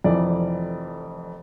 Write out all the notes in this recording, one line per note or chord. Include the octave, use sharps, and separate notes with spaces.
F1 F2 E3 D5